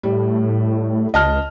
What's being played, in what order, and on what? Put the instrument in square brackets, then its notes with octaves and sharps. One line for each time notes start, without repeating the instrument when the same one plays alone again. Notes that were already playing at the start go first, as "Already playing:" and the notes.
[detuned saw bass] A2 [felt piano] G3
[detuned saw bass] C#2 [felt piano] D#5 A5 F6